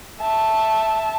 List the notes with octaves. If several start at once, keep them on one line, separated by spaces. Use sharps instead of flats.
E5 A5